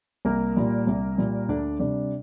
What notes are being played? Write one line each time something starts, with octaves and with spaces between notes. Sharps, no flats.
C2 A#3 A#4
A#2 G3
C2
A#2 G3
D2 D4 D5
C3 G3 D4 D5